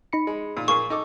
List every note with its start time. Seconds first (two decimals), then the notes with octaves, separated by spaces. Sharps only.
0.13 D#4 B5 C#7
0.27 G#3
0.57 A#2
0.68 A#2 A#3 G#4 C#6
0.90 D#4 A4 D6